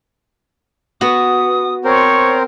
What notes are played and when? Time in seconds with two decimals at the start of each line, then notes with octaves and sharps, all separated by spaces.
1.01 B3 F#4 D#6
1.85 C4 A#4 C5 C#5 C#6